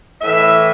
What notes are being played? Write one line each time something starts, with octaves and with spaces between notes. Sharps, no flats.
A2 E3 E5